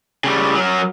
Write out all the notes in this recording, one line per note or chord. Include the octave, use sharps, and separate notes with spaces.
C#3 G3
F#3 A#4